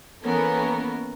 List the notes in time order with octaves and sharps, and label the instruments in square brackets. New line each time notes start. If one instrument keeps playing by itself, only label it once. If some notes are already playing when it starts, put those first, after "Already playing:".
[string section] E3 A#3 B3 C#4 A4 A#4